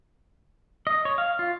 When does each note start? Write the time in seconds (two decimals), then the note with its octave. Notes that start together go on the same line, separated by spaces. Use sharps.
0.87 D#5
1.05 C#5
1.18 F5
1.39 F4